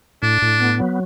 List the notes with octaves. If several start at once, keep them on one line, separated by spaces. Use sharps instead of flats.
A2 D4
A2
B3
F#3